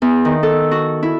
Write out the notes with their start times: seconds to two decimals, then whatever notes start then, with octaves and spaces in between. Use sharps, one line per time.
0.02 E2
0.25 D#3
0.43 A4
0.71 F#4
1.03 E4